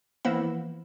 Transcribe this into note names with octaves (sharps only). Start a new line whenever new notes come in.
E3 F3 A#3 B3 E4